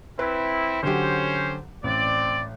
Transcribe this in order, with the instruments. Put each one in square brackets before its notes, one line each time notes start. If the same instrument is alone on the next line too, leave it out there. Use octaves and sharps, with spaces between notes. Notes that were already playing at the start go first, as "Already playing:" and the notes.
[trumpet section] C4 E4 [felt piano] B4
[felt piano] D3 F#3 G4 [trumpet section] C#4 C5
[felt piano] A1 [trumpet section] C4 D5